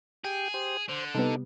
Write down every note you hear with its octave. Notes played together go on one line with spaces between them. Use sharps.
G4 G#4 G5
G4 C5
D3 C5
C3 G3 B3 D#4 A4